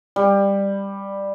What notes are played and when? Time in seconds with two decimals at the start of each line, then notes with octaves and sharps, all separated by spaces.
0.16 G3